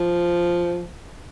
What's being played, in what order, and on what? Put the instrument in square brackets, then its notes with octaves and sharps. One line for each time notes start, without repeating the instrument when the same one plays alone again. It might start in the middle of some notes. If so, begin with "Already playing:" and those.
Already playing: [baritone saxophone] F3